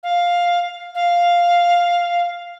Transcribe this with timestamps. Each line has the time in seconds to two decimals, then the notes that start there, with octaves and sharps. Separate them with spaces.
0.03 F5
0.95 F5